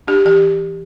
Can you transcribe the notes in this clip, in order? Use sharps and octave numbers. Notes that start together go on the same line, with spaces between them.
D4 G4
E3 G4